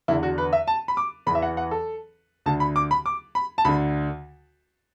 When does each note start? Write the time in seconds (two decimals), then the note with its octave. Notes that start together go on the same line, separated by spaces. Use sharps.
0.08 E2 D3 E4
0.23 F#4
0.38 B4
0.53 E5
0.67 A5
0.88 B5
0.97 D6
1.27 E2 B5
1.31 E3 E5
1.42 F#5
1.57 F#5
1.71 A4
2.46 D2 D3 A5
2.60 B5
2.76 D6
2.91 B5
3.06 D6
3.35 B5
3.58 A5
3.65 D2 D3 B5